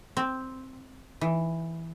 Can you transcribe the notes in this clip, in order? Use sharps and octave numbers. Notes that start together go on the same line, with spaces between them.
C4
E3